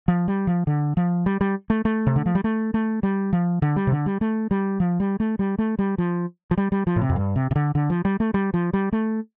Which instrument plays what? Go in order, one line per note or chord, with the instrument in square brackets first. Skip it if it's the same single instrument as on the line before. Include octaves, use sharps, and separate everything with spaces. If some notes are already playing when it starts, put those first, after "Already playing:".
[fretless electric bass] F3
G3
F3
D3
F3
G3
G3
A3
A3
C3
D3
F3
G3
A3
A3
G3
F3
D3
G3
C3
D3
G3
A3
G3
F3
G3
A3
G3
A3
G3
F3
F3
G3
G3
F3
A2
C3
F2
G2
C3
C3
D3
D3
F3
G3
A3
G3
F3
G3
A3